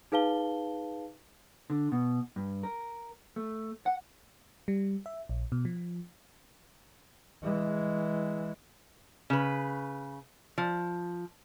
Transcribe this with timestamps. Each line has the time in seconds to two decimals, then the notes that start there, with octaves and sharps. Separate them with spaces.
0.12 D#4 G#4 B4 F5 A5 G7
1.70 D3
1.92 B2
2.36 G2
2.63 A#4
3.36 A3
3.86 F#5
4.68 G3
5.06 E5
5.29 A#1
5.52 B2
5.65 F3
7.42 E3 G#3
9.30 C#3 B4
10.58 F3